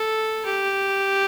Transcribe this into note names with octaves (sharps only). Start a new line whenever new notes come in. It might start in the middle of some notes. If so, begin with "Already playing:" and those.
Already playing: A4
G4